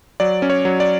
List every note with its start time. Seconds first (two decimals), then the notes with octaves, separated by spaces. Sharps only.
0.20 F#3 D5
0.42 C#4
0.50 C#5
0.65 F#3
0.80 D5